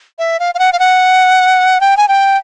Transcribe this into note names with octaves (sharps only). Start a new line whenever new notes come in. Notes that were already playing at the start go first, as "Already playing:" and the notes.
E5
F5
F5
F#5
F5
F#5
G5
G#5
G5